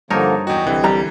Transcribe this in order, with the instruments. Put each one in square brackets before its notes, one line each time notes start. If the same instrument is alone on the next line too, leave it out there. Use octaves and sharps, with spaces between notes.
[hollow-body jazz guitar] G2 [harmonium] D3 F3 A#3 [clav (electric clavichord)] D#4 A#4 C#5 [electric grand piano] A5
[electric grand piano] E2 F#4 [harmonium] D#5 G5
[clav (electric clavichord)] C2 [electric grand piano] D3 E3
[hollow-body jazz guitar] G3 A#5